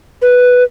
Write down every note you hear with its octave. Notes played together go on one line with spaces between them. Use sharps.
B4